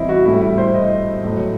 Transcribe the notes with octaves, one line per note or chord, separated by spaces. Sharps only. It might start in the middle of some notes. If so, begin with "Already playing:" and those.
Already playing: C3 E3 G3 E4 C5 D#5
F#4
A2 G3 E4
E4
C5
D#5
A2 F#3